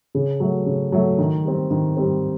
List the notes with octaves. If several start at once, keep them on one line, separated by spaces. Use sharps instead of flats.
C#3
F#3 A3
C#3
F#3 A3
D#3
G3 C4
D#3
G3 C4